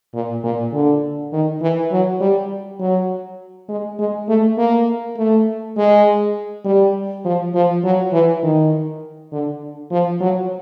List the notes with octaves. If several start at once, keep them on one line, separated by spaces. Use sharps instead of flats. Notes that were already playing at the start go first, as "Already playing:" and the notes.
A#2
A#2
D3
D#3
E3
F#3
G3
F#3
G#3
G#3
A3
A#3
A3
G#3
G3
F3
F3
F#3
E3
D#3
D3
F3
F#3